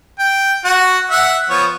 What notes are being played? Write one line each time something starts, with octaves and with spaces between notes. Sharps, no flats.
G5
F#4 F#5
E5 F#5
F3 B3 C#5